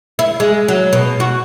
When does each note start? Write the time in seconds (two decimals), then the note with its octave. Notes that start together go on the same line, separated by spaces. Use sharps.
0.19 E4
0.40 G#3
0.68 F#3
0.93 B2
1.20 F#4